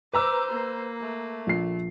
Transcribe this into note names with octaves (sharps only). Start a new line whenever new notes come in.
B4 C5 A#5 D6 E6
A#3
A3
A#1 C7